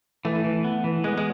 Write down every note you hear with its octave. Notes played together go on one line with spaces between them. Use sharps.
E3 A3
E3
B3
E3
G#3 B3
G#3